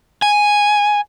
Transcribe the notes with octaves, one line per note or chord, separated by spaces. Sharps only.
G#5